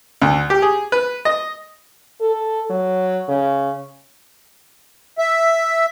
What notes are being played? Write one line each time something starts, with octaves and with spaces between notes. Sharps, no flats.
D2
G4
G#4
B4
D#5
A4
F#3
C#3
E5